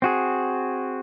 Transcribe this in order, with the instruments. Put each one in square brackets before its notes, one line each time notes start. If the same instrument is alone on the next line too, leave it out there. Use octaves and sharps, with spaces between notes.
[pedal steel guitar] C4 F#4 G#4